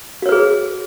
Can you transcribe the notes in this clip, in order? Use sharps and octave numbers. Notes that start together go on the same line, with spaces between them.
F#4 G#4 B4 C#5